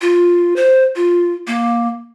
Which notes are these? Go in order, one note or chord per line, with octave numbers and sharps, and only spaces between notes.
F4
C5
F4
A#3